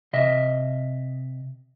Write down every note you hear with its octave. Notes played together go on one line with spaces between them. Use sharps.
C3 D#5 E5